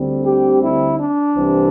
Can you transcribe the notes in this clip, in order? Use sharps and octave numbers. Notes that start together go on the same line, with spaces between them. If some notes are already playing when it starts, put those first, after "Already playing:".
Already playing: D2 D3 G3 C4
G4
E4
D4
C2 C3 E3 C4